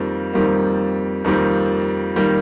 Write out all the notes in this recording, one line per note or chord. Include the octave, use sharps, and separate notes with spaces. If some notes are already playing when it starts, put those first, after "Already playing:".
Already playing: F2 D#3 G3 A#3
F2 D#3 G3 A#3
F2 D#3 G3 A#3
D#3 G3 A#3